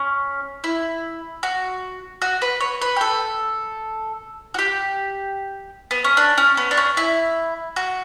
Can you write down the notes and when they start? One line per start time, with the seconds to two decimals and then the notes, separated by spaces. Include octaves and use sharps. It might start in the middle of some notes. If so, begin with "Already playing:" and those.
Already playing: C#4
0.64 E4
1.43 F#4
2.22 F#4
2.42 B4
2.61 C#5
2.82 B4
2.96 G4
3.01 A4
4.54 F#4
4.59 G4
5.91 B3
6.04 C#4
6.17 D4
6.37 C#4
6.57 B3
6.71 D4
6.77 C#4
6.97 E4
7.76 F#4